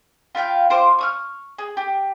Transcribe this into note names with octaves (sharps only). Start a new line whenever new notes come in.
F4 B4 F5 G5
F4 C5 D6
C#6 D#6 F6
G#4
G4